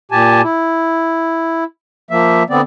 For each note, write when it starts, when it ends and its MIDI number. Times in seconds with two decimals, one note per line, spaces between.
0.11 0.42 46
0.11 0.42 67
0.11 0.42 80
0.11 0.42 81
0.43 1.64 64
2.11 2.43 53
2.11 2.43 58
2.11 2.43 76
2.50 2.61 50
2.50 2.61 59
2.50 2.61 60
2.50 2.61 74